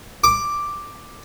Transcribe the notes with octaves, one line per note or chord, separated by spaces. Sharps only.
D6